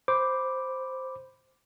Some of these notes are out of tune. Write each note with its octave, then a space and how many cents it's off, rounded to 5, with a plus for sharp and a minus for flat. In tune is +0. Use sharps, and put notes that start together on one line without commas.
C5 +0 B5 +0 D6 +0